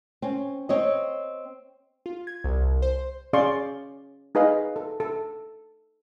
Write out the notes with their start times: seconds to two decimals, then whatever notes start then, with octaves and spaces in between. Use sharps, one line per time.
0.22 C4 C#4
0.69 C4 C#5 D#5
2.06 F4
2.27 G#6
2.44 C2
2.82 C5
3.33 C#4 G#4 D5 F5 C6 C#6
4.35 D#4 G#4 B4 D#5 F5
4.76 A4
5.00 A4